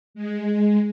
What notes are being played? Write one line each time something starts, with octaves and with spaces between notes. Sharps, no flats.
G#3